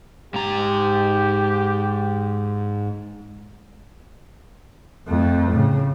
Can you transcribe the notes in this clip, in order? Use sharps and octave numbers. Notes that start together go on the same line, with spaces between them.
G#2 G4 A#5
F2 A3
A2 C#3